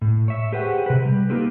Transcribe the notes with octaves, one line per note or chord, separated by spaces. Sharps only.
A2
C#5 E5
G4 G#4 B4 C5 F#5 G5
C3 B4
G3
A#3 D#4 F4 G4 A4 B4